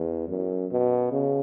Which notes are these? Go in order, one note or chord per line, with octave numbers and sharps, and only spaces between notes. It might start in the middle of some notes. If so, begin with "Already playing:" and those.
Already playing: E2
F#2
B2
C#3